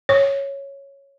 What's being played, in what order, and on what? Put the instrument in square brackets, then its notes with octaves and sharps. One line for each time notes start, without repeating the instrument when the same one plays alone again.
[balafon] C#5